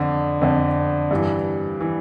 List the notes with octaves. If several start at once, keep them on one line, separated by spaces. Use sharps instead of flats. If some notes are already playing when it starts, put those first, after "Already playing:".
Already playing: F2 D3
F2 D3
G2 E3
E3